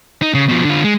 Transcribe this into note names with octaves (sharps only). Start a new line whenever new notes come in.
D#4
C#3
B2 F3
D3 F4
G#3